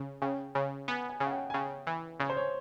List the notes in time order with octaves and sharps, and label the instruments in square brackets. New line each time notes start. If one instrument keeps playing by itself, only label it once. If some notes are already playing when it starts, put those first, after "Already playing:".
Already playing: [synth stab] C#3
[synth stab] C#3 [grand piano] G5
[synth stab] C#3
[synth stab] B3 [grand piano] G#5
[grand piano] G#5
[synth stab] C#3
[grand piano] F#5
G5
G#5
[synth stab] C#3 [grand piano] G5
[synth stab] E3
[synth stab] C#3 [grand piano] C#5
[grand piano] C5
C#5